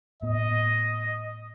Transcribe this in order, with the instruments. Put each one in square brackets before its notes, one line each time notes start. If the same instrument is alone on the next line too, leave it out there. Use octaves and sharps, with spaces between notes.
[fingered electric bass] A2 B3 [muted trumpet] D#5